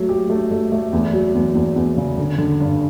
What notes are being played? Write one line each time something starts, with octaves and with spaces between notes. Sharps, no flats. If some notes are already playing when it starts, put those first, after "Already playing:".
Already playing: F#3 A3
G4
A3
A3
A3
E2
F#3
E2
E2
E2
C#3
D3
D3
G2